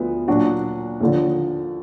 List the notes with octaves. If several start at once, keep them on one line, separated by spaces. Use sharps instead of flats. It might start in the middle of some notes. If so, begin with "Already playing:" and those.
Already playing: D2 F3 B3
A#2 F#3 D4 F#4
D#2 D3 F3